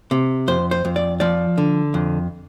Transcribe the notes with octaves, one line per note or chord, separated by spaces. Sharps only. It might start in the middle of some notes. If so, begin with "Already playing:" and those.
C3
F2 C5
C5
F2
D5
F3 D5
D3
F2